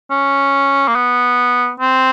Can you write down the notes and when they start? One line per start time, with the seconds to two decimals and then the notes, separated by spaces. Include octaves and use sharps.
0.11 C#4
0.88 A#3
0.95 B3
1.80 C4